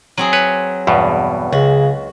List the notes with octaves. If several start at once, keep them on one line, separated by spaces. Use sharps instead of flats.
F#3 C4 G#4
B4 C#5
E2 G2 B2
C#2 C#3 F#4